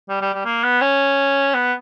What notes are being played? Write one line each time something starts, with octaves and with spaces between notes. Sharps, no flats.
G3
G3
G3
A#3
B3
C#4
B3